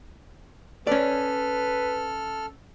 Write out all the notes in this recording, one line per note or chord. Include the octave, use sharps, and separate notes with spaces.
C#4 A4 B4 D5 F6